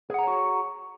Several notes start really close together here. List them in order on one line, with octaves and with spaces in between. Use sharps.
G#4 F#5 A#5 C#5 F#4